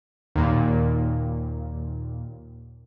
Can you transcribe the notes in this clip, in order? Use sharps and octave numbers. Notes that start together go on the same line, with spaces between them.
D#2 A#2